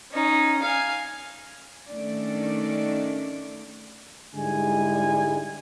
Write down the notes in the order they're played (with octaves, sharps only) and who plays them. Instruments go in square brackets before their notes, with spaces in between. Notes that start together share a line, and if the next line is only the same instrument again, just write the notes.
[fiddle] C#4 D#4
F5 G#5
[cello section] D#3 A3 C#4 D4 D5
[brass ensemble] G#2 D3 G3 G#3 E4 G#5